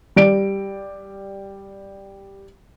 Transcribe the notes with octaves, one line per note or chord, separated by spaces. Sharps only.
G3 D5 D7